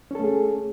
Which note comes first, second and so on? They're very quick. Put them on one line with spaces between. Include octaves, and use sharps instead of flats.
C#4 A4 A3 G#4